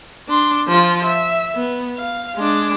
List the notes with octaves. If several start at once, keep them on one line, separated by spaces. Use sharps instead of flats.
D4 C6
F3 F4
E5
B3
F5
G#3 D4